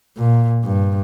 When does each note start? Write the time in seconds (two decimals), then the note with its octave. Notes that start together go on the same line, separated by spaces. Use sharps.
0.17 A#2
0.64 G2